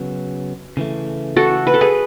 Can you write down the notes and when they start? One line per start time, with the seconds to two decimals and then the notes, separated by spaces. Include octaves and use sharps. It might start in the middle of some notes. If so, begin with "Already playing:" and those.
Already playing: C#3 F#3 B3
0.77 C#3 E3 A3
1.36 F#4 A4
1.67 B4
1.74 A4
1.81 G#4 B4